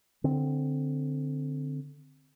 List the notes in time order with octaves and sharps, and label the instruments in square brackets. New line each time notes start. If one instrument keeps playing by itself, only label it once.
[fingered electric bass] D3 C4